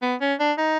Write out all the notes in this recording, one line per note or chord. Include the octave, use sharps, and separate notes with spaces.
B3
C#4
D4
D#4